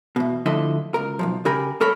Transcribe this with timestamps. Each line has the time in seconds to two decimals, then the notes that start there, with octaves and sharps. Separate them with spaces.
0.16 E2 B2
0.46 D2 D3 F3 E4 D#5
0.94 C#2 A#4
1.19 B1 G#2 F3
1.45 C#3 G4 A#4 G#5 B5
1.80 G2 A4 A#4 C#5 B5